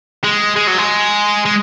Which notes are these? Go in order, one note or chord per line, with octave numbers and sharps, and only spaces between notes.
G#3
G#3
F#3
G#3
G#3